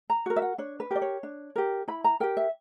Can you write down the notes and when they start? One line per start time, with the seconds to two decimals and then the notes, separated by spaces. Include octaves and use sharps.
0.10 A#5
0.26 F#4 A#4
0.36 E5
0.42 F#5
0.58 D4 C#5
0.80 B4
0.91 G4 A#4 D5
1.02 C#5
1.23 D4
1.56 G4 A#4
1.88 E4 B5
2.04 A#5
2.20 G4 A#4 G5
2.37 E5